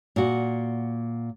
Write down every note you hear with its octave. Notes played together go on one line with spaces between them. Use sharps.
A#2 F#4